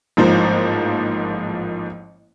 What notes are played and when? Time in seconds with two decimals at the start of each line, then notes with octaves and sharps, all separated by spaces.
0.17 A1 G#2 F3 A#3 C5